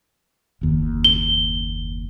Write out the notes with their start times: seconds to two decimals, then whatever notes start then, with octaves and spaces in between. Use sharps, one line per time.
0.61 F#1 D#2
1.04 G7